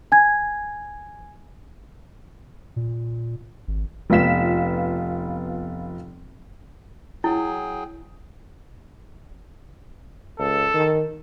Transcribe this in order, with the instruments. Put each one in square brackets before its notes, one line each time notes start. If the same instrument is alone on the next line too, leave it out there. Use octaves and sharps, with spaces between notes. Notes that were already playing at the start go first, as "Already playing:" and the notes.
[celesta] G#5 G#6
[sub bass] A#2
G#1
[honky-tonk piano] F1 B3 F4 B6 E7
[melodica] F#3 G#4 G5 [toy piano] E4
[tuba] C#2 [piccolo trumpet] A4
[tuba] D#3